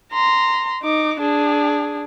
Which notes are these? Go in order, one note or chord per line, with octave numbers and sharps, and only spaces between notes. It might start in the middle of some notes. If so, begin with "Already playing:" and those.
A#5 C6
D#4 D6
D4 G#4